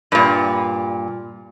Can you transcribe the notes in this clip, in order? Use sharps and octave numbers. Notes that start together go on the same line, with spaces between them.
G2 A#2